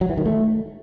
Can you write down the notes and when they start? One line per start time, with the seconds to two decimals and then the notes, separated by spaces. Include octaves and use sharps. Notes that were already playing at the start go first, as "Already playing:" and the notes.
0.01 F#3
0.09 E3
0.17 D#3
0.25 A3